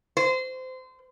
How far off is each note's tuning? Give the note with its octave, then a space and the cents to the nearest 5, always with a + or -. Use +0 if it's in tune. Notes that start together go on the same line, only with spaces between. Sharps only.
C5 -25